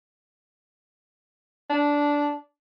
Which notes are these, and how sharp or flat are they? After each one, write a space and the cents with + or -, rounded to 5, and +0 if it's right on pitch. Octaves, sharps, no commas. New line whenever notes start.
D4 -10